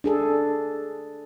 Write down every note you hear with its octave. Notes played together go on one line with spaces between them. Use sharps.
D4 G#4 A4